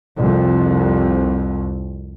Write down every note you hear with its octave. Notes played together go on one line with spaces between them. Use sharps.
C2 F2